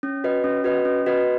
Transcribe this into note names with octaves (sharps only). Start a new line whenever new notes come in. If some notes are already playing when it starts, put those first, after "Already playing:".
C#4
F#4 B4 D#5
C#4
F#4 B4 D#5
C#4
F#4 B4 D#5